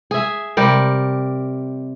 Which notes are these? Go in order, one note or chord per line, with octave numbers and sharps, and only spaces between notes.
G#4 E5
C3 G3 G4 A#4